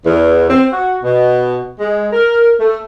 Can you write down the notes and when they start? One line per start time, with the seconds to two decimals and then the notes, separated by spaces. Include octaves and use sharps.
0.05 E2
0.50 C4
0.73 F#4
1.03 B2
1.79 G#3
2.13 A#4
2.59 A3